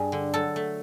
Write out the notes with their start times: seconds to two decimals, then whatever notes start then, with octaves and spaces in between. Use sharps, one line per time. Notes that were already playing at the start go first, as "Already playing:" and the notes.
Already playing: G2 G3 G#4
0.12 D3
0.34 F#3 A4
0.56 A3